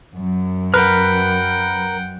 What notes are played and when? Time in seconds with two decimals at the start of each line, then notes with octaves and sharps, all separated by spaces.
0.16 F#2
0.74 A#4 B4 F#5 G5 F6